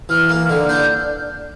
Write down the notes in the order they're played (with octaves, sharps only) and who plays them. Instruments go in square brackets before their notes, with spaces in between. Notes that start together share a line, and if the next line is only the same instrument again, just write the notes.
[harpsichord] E3 [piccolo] F6
[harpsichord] A#3 [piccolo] F6
[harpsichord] D3 [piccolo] F6
[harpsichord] D4 [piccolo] G6